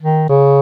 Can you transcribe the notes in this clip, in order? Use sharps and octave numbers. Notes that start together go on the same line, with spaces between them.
D#3
C#3